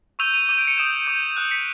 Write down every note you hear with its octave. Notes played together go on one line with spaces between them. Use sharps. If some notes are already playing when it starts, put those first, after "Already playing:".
C#6 E6 G6 D#7 F7
D#7 F7
D6 G6 D#7
D7
C#7 D#7
D#6 G6 D7 E7
D6 G6
D#6 F#6
B6 C#7